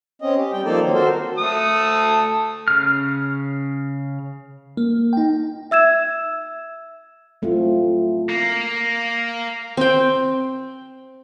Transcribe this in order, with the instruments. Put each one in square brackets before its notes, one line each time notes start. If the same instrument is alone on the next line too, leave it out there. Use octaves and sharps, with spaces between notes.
[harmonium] C4 C#4 D#5
G4
G3 G5
F3 A#3 D#4 A4 D5
D#3 F#3 C4
F#4 A4 A#4 C5
[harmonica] A3 A4 D#6
[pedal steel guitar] C#3 F6
[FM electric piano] A#3
D#4 G5
[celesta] E5 E6 G#6 E7
[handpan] F#3 A3 C4 E4 F4
[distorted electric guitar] A#3
[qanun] C4 G5